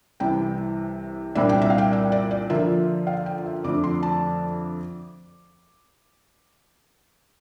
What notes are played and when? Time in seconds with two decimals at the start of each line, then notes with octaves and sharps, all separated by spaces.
0.20 C2 C3 E3 G5
1.35 C2 A#2 G3 D4 E5
1.49 G5
1.62 E5
1.70 F5
1.78 G5
1.93 E5
2.12 D5
2.31 D5
2.50 D3 F3 A#3 F4 E5
3.07 F5
3.26 G5
3.46 E5
3.64 F2 D3 A3 D4 F4 D6
3.84 C6
4.03 A5